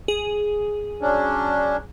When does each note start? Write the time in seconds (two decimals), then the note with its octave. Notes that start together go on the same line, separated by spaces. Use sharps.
0.08 G#4
1.01 F#3 C#4 D4